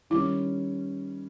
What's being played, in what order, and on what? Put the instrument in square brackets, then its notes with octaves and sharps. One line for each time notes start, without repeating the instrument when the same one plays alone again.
[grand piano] D#3 G3 C#4 [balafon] E4